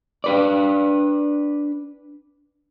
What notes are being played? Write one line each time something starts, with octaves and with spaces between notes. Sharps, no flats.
D4 B4 D5